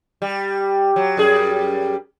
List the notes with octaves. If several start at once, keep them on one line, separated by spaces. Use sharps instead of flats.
G3
F#3
F#2 G3 G#4